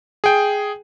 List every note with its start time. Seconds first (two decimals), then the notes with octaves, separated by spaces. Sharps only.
0.24 G#4 G5